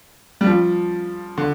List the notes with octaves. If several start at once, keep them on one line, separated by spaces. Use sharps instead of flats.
G3
F3
D3